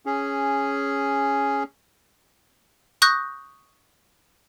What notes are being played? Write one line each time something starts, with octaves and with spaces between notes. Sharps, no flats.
C#4 G#4
C#6 D#6 F#6 G6 A#6